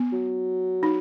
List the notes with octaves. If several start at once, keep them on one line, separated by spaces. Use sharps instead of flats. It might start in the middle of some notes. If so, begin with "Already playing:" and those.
Already playing: B3
F#3
D#4